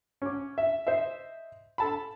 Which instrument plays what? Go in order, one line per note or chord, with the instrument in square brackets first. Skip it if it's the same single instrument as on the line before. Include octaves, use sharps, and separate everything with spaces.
[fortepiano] C#4 D6
E5
C5 D#5 E5
A4 A5 B5